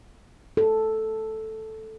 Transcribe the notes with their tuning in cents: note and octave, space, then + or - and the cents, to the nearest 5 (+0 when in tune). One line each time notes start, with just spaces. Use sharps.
A4 +0